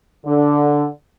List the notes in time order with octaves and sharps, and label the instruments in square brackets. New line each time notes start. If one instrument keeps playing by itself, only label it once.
[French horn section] D3